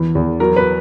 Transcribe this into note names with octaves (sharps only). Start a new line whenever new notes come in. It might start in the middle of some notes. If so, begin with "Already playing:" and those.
Already playing: E2 E3
E2
F#3 A#4
B4